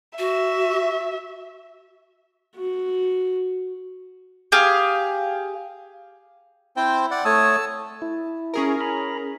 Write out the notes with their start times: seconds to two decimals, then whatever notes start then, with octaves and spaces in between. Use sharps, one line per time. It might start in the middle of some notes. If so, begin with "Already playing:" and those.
0.19 F#4 E5
2.56 F#4
4.52 G4 G#4 F5
6.77 C4 E4 C5 G5
7.11 D5 F#5
7.25 A3 C#5 A5 D#6 E6
8.02 E4
8.54 C#4 G#4 A#4
8.81 A#5 B5